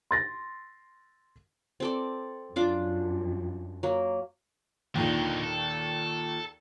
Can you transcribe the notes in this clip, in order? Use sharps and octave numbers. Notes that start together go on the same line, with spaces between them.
C6 A6 A#6
C4 A4 D5
F#2 D4 F4 D6
F#3 A#3
D#2 A#2 D3 D#3 D#4
A4